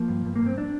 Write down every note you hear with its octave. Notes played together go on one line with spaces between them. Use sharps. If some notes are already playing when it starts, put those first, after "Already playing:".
Already playing: F3 A#3
G2
G2
A#3
G2
C4
D4